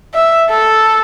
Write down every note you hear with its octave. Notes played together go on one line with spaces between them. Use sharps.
E5
A4